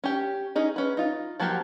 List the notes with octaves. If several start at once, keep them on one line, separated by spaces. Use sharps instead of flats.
C#4 G4
C#4 D#4 G#4
C#4 B4
D#4 F4
F3 F#3 A#3 F#4 G4